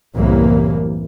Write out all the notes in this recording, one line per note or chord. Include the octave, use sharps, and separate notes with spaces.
C2 F#2 A2 E3 A#3